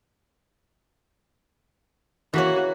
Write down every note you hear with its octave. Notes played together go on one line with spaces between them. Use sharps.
E3 A#3 F#4 C#5